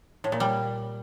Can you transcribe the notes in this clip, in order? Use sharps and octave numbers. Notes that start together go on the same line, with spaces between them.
A2
A#2
G3